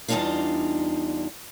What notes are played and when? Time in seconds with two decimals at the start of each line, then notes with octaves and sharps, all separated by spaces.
0.08 E2 G3 D4 D#4 F4 F5